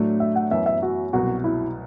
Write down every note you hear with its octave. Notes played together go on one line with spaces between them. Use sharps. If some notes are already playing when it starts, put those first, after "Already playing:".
Already playing: A2 F#3 A3 D4
E5
F#5
F#2 E3 B3 E5
E5
F#4
C2 B2 F#3 F#4
E4